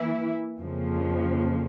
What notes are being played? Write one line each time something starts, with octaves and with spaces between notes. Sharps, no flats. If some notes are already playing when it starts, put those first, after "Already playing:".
Already playing: E3 A#3 E4
F2 C#3 F3 A#3